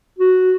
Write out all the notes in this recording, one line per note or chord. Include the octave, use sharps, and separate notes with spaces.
F#4